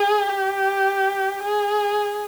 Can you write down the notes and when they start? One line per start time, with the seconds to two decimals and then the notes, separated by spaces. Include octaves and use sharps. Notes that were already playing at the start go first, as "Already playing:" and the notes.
Already playing: G#4
0.29 G4
1.43 G#4